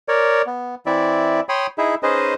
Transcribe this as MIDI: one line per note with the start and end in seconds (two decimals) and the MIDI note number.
0.08 0.42 70
0.08 0.42 73
0.08 0.42 74
0.46 0.75 59
0.86 1.40 52
0.86 1.40 60
0.86 1.40 64
0.86 1.40 74
0.86 1.40 76
1.49 1.67 73
1.49 1.67 79
1.49 1.67 83
1.49 1.67 84
1.49 1.67 87
1.78 1.95 63
1.78 1.95 64
1.78 1.95 68
1.78 1.95 76
2.03 2.34 61
2.03 2.34 63
2.03 2.34 68
2.03 2.34 71
2.03 2.34 72
2.03 2.34 75